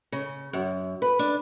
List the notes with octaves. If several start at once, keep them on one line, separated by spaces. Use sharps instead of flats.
C#3
F#2
B4
D4